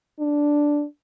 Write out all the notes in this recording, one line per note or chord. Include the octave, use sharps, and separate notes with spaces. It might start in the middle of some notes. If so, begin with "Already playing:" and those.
D4